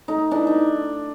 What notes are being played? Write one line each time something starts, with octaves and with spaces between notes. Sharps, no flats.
A3 D#4
E3 D4
D#4